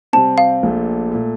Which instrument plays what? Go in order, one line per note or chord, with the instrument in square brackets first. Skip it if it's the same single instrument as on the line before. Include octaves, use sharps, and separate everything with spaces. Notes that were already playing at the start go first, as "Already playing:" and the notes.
[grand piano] C3 G3 C4 [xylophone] A5
[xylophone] F5
[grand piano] A#1 A#2 A3
A#2 A3